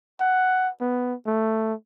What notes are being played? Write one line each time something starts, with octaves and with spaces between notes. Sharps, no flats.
F#5
B3
A3